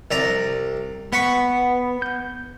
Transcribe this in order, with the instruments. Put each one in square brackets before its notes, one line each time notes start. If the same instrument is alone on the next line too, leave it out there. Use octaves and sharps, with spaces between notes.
[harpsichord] C2 D5 A#5
[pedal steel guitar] B3 [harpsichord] F#5 B5 C#6
[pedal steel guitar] G6